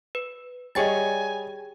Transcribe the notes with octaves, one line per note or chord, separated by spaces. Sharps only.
B4
G3 G#4 C#5 D#5 G5 G#5 A6